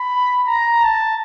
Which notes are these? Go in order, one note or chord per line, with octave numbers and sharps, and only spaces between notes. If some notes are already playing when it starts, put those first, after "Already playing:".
Already playing: B5
A#5
A5